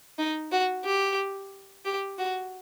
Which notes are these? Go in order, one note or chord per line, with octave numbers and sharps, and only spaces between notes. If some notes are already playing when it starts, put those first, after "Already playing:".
D#4
F#4
G4
G4
F#4